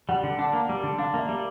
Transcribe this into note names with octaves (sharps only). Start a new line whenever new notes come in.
G3 F#5
D3
D4 F#5
A#3
G3
D3
D4 F5
A#3 E5
G3